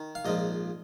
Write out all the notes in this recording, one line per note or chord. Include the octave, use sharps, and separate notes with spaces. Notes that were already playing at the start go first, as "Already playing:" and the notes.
Already playing: D#3
F5
A#1 G#2 F3 D#5